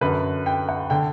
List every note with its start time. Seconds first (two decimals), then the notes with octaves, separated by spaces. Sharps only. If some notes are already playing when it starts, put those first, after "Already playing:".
0.01 F#2 D3 B4
0.46 G5
0.69 F#5
0.90 D3 G5